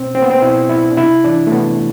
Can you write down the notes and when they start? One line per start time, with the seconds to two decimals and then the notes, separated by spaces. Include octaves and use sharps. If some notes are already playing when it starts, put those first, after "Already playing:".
Already playing: B2 C4
0.15 C4
0.22 B3
0.30 C4
0.42 B2 E4
0.70 E4
0.91 D4
0.97 C3 E4
1.25 E3 D4
1.47 A3
1.51 C3 B3